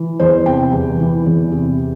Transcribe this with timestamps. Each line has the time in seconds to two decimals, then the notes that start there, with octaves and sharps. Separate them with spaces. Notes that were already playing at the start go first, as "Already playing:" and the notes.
Already playing: E3
0.20 E2 C5
0.46 C3 G5
0.73 E2
0.99 E3
1.26 E2
1.52 C3